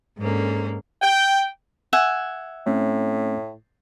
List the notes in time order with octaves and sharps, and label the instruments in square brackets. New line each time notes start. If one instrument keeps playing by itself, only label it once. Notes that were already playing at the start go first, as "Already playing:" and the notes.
[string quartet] G#2 D3 A#3 C#4
[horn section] G5
[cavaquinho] E5 F#5 G#5
[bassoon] A2 [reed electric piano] A3 C4 C#4